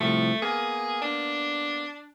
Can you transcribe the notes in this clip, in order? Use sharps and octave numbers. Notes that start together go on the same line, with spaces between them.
C2 A2 F3 A3
A#3 B3 G#4
D4